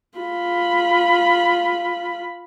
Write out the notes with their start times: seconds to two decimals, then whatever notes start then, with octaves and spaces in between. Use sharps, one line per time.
0.19 F4 B5